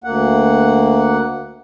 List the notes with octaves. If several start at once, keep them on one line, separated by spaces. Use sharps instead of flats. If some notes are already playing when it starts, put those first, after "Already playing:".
D2 A#3 F#5